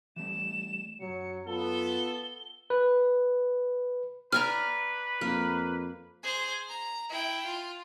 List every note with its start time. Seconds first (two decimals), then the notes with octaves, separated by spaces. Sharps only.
0.16 E3 G3 A3 E7
1.00 C2 F#2 F#3 C#7
1.47 B3 F4 A4 G7
2.70 B4
4.32 B4 D5 G#5 A#5 F6
5.21 F2 A#3
6.23 G#4 C5
6.68 A#5
7.10 E4 G5
7.45 F4